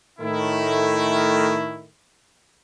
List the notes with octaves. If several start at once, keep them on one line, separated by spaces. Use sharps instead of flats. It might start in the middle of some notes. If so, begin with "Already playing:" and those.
A2 D#3 A3 E4